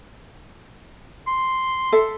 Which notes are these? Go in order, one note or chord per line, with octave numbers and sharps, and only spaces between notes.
C6
A4 E5